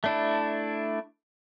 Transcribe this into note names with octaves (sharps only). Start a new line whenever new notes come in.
A3 D4 E4